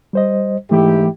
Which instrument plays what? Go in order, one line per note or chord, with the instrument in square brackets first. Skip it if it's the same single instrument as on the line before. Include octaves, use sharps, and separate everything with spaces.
[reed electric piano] G3 C5 D#5
[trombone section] G#2 E4 G4 [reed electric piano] E3 A3